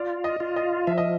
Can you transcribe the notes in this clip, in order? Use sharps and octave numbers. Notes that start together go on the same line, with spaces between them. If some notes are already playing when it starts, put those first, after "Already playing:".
Already playing: F4 D5
D#5
F4
D#5
F3 E5
D#5